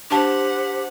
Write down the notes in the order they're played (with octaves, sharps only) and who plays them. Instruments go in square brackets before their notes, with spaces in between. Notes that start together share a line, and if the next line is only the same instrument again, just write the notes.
[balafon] D4 A5 [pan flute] G4 [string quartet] C5 F#5